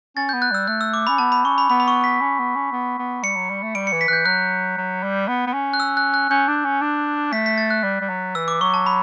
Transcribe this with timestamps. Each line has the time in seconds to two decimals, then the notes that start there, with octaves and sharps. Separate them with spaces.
0.16 C#4 A6
0.29 B3 G6
0.42 F#6
0.51 G3 E6
0.67 A3 F#6
0.81 E6
0.94 D6
1.07 C#4 B5
1.18 B3 A5
1.32 B5
1.45 C#4 C#6
1.58 B5
1.70 B3 B5
1.80 B5
1.88 C#6
2.04 B6
2.21 C#4
2.39 B3
2.55 C#4
2.72 B3
2.99 B3
3.23 G3 C#7
3.36 F#3
3.50 G3
3.63 A3
3.75 G3 D7
3.87 C#7
3.92 E3
4.01 B6
4.08 E3 F#6 G6
4.26 F#3 F#6
4.77 F#3
5.03 G3
5.28 B3
5.47 B3
5.53 C#4
5.73 F#6
5.80 E6
5.97 F#6
6.14 F#6
6.30 C#4 G6
6.48 D4
6.65 C#4
6.81 D4
7.32 A3 B6
7.46 B6
7.58 A6
7.70 F#6
7.83 G3
8.01 G3
8.09 F#3
8.35 E3 E6
8.48 D6
8.61 F#3 C#6
8.74 A5
8.86 B5